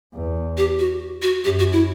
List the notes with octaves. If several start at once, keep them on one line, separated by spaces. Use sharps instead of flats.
E2
G4
F#4
F#4
F#2 G4
F#4
E4